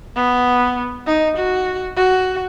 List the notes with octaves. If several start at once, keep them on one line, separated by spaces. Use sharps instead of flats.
B3
D#4
F#4
F#4